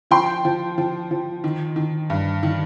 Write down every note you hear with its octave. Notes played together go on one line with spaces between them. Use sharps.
F3 G5 C6
F3
F3
F3
D#3
D#3
G2
D#3